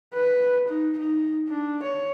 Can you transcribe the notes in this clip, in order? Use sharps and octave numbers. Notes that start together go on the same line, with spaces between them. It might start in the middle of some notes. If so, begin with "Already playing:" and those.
B4
D#4
D#4
D4
C#5